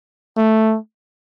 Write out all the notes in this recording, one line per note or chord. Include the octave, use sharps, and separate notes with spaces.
A3